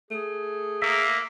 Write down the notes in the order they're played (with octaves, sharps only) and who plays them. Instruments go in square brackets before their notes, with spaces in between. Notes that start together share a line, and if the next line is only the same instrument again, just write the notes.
[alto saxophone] A3 [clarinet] G#4
[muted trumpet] A#3 [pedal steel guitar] E5